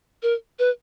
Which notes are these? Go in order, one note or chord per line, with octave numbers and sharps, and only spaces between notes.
A#4
B4